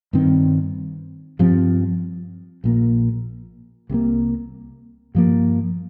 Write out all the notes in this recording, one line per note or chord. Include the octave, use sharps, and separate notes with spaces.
G2 D#3 C4
G2 F3 C4
A#1 A#2 A#3
C2 C3 G3 A#3
G2 F3 A#3